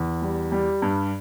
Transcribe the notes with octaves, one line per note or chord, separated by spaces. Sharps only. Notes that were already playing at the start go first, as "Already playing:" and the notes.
Already playing: E2
G3
G3
G2